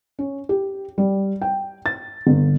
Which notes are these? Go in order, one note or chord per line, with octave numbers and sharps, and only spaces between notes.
C#4
G4
G3
G5
A6
G1